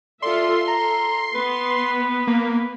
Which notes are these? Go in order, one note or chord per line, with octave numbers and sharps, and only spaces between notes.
F4 A4 D5 E5 C6
A4 A#5
B3 B4
A#3